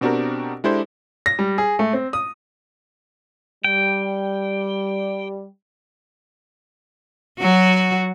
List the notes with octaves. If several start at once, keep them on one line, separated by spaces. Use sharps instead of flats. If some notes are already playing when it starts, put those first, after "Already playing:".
B2 C4 D4 F#4 G4 A#4
G#3 D4 E4 G4 A4 C5
A#6
G3
G#4
A3
C4
D#6
G3 G5
F#3 F#4